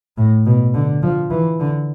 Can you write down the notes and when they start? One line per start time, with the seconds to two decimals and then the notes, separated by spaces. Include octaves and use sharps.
0.17 A2
0.46 B2
0.74 D3
1.03 F3
1.30 E3
1.60 D3